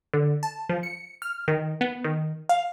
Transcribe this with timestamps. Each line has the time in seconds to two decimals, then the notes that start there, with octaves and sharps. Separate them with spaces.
0.14 D3
0.43 A5
0.69 F3
0.83 C#7
1.22 F6
1.48 D#3
1.81 B3
2.04 D#3
2.49 F5